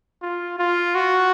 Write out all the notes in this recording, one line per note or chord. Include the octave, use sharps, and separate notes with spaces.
F4
F4
F#4